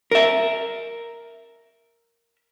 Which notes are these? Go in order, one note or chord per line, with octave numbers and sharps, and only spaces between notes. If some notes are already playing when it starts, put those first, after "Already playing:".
A#4 E5